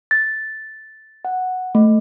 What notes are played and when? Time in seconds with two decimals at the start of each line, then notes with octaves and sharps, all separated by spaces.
0.11 A6
1.25 F#5
1.75 A3